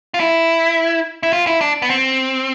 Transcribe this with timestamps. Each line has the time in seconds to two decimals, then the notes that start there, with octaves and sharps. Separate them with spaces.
0.14 F4
0.20 E4
1.23 E4
1.33 F4
1.47 E4
1.61 D4
1.82 B3
1.90 C4